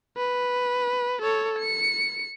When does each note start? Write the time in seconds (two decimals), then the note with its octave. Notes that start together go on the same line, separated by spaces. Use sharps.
0.17 B4
1.22 A4 C#5
1.59 C#7